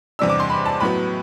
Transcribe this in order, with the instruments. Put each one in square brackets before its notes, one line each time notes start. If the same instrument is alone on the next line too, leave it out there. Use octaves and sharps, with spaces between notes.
[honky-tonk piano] E2 C3 G3 D4 E6
D6
C6
B5
A5
A2 F#3 B3 B5